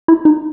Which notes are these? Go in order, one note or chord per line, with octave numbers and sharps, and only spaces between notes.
E4
D#4